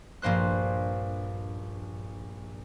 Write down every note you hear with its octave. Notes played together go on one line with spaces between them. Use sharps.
A#1 G2 A#3 C5 F#6